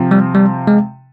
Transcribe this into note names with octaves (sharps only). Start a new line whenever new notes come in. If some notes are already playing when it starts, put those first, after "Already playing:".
Already playing: C3 F3 C4
G3
G3
G#3